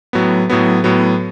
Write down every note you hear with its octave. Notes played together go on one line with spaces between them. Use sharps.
A2 F#3 B3
A2 F#3 B3
A2 F#3 B3